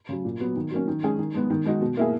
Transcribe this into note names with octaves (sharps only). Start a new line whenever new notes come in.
C#3 F#3
A#2
F#3 B3
D#3
F#3 A#3 C#4
D#3
G#3 C#4 G#4
D#3
G#3 B3
D#3
G#3 D#4 F#4
B2
A#3 E4 G#4